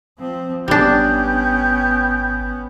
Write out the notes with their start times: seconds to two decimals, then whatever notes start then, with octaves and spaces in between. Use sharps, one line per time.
0.19 F3 C4
0.68 G#1 G3 B3 C#4 D4 G5